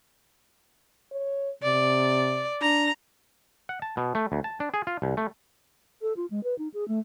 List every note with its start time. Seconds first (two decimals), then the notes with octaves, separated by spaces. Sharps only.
1.11 C#5
1.63 C3 D5
2.62 D4 A#5
3.69 F#5
3.82 A5
3.97 B2
4.15 A3
4.32 D2
4.44 A5
4.60 D4
4.74 G#4
4.87 F4
5.02 C2
5.17 A3
6.02 A4
6.17 F4
6.31 G#3
6.44 B4
6.58 D#4
6.74 G#4
6.88 A3